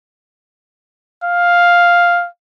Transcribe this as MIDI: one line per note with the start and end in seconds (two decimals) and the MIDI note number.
1.24 2.28 77